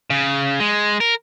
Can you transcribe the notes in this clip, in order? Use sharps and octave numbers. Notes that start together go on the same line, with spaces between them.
C#3
G#3
A#4